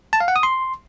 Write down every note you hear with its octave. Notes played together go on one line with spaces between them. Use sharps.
A5
F5
F#5
D#6
C6